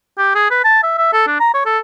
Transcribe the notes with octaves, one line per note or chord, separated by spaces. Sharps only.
G4
G#4
B4
A5
E5
E5
A4
D4
A#5
C#5
A4